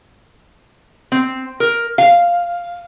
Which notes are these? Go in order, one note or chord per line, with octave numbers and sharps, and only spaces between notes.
C4
A#4
F5